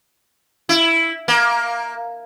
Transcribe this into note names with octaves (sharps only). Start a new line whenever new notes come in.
E4
A#3